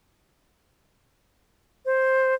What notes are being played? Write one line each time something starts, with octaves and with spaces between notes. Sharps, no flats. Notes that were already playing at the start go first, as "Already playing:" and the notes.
C5